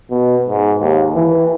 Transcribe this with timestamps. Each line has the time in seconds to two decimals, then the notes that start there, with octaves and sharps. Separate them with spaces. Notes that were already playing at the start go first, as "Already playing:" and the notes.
0.10 B2
0.48 G#2
0.81 D#2
1.15 E3